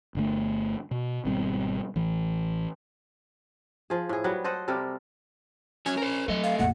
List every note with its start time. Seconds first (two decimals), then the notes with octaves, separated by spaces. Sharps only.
0.15 G1 D3 A3
0.91 B2
1.25 G#1 B2 G3 C4
1.96 A1 E3
3.90 F3 G#4
4.09 A2 G#4
4.24 F#3 G3 B3 F#5
4.44 A4 C5 D#5 F#5
4.68 C3 G3 A4 A#4
5.86 F#3 C#4 G#5
5.98 A#4 C5
6.28 F#3 A3 D#5
6.44 F5
6.59 A#1 F2 F#5